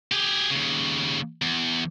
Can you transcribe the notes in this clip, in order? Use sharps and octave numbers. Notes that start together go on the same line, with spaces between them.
G4 G#4
D#2 C#3
E2